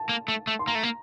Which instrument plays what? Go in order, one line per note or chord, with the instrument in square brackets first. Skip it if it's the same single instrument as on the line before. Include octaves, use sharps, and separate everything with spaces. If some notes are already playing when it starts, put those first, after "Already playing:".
Already playing: [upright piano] A5
[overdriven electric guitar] A#3
A3
A3
[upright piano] C6
[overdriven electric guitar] A#3 [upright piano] A#5
[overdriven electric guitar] A3
A#3